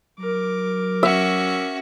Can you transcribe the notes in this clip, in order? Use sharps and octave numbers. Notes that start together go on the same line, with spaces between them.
F#3 A#4 D6
C#4 F#4 E5